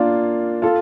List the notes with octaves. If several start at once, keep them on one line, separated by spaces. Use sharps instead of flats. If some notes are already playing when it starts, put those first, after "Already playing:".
Already playing: A#3 D4 F4
F4 A4